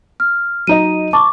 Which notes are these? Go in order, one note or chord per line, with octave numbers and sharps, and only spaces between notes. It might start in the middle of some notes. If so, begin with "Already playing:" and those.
F6
F#3 D#4 D#5 D#7
A5 C#6 D6